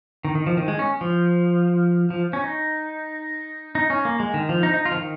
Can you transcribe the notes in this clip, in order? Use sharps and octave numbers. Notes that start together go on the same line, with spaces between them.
D#3
D#3
F3
D#3
G#3
C#4
F3
F3
C#4
D#4
D#4
C#4
A#3
G#3
D#3
F3
D#4
D#4
F4
F3
D#3